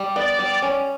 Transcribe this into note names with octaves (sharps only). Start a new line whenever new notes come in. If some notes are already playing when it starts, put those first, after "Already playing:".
Already playing: G3
B3 D5
G3
C#4